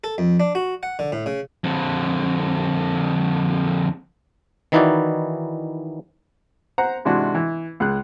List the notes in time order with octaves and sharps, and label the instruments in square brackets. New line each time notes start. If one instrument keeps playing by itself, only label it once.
[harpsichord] A4
F2
D4
F#4
F#5
D3
A2
C#3
[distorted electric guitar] F2 D3
[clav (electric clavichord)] D#3 E3 D#4 E4 F#4 D5
[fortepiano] C5 F#5 A#5
G#2 C3 E3 D4 F#4
E3
C#2 G#3 F#6